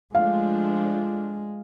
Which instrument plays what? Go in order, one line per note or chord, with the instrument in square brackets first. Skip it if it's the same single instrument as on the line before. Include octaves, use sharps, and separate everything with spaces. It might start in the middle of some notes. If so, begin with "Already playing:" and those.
[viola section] F3 A3 D4 [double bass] G#3 [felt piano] F5